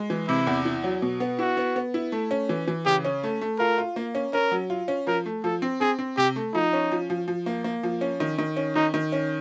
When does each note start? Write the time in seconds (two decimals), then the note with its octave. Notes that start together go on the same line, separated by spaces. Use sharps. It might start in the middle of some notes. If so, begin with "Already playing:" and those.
Already playing: G#3
0.10 E3
0.28 C3 E4
0.47 E2
0.65 E4
0.84 F#3
1.02 B2
1.20 B3
1.39 E4 F#4
1.57 B3
1.76 B3
1.94 E4
2.12 A3
2.31 C#4
2.49 E3
2.68 E3
2.86 C#3 G4
3.04 C#4
3.23 A3
3.41 A3
3.59 F4 A#4
3.78 F4
3.96 A#3
4.15 C#4
4.33 C#4 A#4
4.51 F#3
4.70 F4
4.88 C#4
5.07 F3 A#4
5.26 A3
5.44 F3 A4
5.62 C4
5.81 C4 G#4
5.99 C4
6.17 C3 G4
6.36 A3
6.54 F3 D#4
6.73 C#4
6.92 F3
7.10 F3
7.28 F3
7.46 A#3
7.64 A#3
7.83 F3
8.01 C#4
8.20 D#3
8.38 D#3
8.56 C#4
8.76 D#3 D#4
8.94 D#3
9.12 C#4